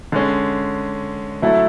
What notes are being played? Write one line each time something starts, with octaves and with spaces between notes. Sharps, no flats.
D3 G#3 C#4
D3 F#3 A3 E4 A4